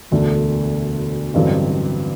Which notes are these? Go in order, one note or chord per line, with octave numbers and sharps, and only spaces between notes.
E1 D2 D3 A3 D4
A1 G2 D3 F#3 C4